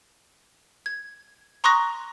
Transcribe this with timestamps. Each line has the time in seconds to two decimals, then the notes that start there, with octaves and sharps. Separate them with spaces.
0.86 G#6
1.64 A#5 C6 C#6 D#6 F#6 A#6